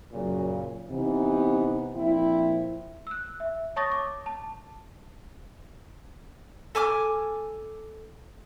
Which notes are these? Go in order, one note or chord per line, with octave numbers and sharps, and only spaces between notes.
F#2 A#2 C#3
C3 E3 B3 D#4
A#1 C4 E4
E6 F#6
E5
C#5 A5 C#6 D#6 A6 A#6
D6
A5
A4 G#5 D6 F6